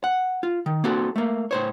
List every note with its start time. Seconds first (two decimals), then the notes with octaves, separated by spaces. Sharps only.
0.04 F#5
0.43 F4
0.66 D#3
0.84 A#3 C4 F#4 A4
1.16 A3 A#3
1.51 A2 C5 C#5